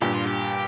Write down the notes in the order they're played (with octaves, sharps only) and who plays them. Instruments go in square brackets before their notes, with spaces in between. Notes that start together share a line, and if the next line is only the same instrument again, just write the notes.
[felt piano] G2 A#2 [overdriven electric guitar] G4
[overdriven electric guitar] F4
G4